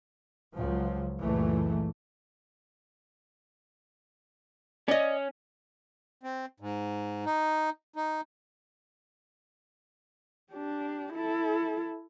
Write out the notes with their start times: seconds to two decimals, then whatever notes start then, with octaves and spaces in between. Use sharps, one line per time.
0.55 C#2 F3 F#3
1.22 C#2 F#2 A#2 E3 A3
4.88 C#4 D5 D#5
6.23 C4
6.60 G#2
7.26 D#4
7.96 D#4
10.52 D4 G4
11.13 E4 A4